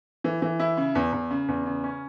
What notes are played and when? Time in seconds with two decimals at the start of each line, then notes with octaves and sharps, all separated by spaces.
0.24 E3
0.42 E3
0.60 E4
0.77 C#3
0.95 E2
1.13 E2
1.30 C#3
1.48 E2
1.66 C#3
1.84 C#4